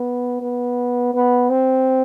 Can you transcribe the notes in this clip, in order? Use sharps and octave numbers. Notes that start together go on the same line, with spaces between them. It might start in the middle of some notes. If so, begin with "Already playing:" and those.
Already playing: B3
B3
B3
C4